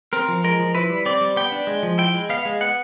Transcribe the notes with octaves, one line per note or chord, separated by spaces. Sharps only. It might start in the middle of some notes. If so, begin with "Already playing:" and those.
C4 A#4
F3
G#3 A#4
F3
E4 B4
G3
C4 D5
G3
B3 G5
D4
G#3
F3
E4 G5
G#3
B3 F5
G#3
B3 F#5